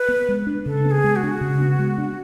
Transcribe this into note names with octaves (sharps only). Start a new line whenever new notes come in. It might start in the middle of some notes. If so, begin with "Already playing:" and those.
Already playing: B4
B3
G#3
D4
C#3 A4
B3
G#4
G#3
F#4
D4
C#3
B3
G#3
D4